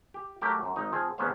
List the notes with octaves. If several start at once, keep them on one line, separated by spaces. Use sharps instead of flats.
G4
F#3 A3 G4 A#4
F#2
G#1 D#4
F3 C4 G#4
E2 C3 B3 C#4 C5 F5